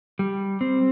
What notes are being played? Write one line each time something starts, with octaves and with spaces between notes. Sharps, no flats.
G3
C4